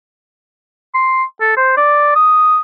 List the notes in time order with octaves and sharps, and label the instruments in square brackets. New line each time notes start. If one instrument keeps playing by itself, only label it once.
[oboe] C6
A4
C5
D5
D#6